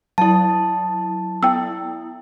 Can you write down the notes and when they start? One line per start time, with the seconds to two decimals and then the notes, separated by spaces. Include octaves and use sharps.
0.18 F#3 E4 A5
1.43 B3 E4 G5 E6